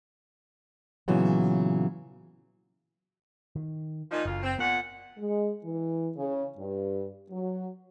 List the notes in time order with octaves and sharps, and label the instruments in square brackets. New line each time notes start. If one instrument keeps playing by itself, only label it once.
[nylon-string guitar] A#2 C#3 E3 F#3 B3
[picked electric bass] D#3
[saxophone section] A#2 F3 D#4
[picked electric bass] F#1 [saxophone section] D2 F4
[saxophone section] C4
[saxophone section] A#2 F#5 [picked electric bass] B3
[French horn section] G#3
E3
C#3
G2
F#3